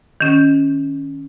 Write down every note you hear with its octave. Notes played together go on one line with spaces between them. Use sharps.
D#3 C#4